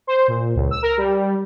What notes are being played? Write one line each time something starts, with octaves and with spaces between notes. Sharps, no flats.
C5
A#2
C#2
E6
A#4
G3